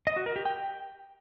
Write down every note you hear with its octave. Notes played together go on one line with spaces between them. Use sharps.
D#5
F#4
A#4
G4
G5